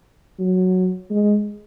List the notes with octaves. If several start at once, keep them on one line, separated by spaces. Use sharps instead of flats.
F#3
G#3